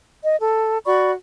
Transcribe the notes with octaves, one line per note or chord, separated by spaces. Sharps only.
D#5
A4
F#4 D5 B5 C#6